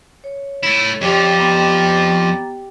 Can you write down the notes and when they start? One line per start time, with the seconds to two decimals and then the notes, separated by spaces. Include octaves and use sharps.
0.24 C#5
0.63 A3 E4
1.01 F2 F3 G4 D5
1.37 B3 A#5